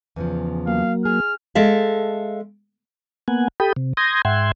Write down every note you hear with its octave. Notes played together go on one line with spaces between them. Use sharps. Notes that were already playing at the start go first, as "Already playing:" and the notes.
E2 C#3 F3
F#3 A#3 F5
G#4 F6
G#3 A4 E5 F5
A#3 B3 F#5 G#5
G4 A4 G5 B5 D#6
C3
C6 D#6 G6 G#6 A#6
G#2 E5 F#5 G5 C6 G#6